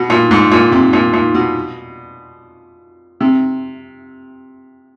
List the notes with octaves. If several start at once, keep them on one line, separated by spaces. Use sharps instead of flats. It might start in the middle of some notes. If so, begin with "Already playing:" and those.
Already playing: B2
A#2
G#2
A#2
C3
A#2
A#2
B2
C3